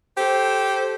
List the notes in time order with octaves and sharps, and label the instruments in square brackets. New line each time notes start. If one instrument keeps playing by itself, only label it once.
[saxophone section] G4 A4 C5